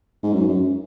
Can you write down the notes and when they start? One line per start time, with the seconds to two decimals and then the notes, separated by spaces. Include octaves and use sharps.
0.23 G#2
0.33 F#2
0.48 F#2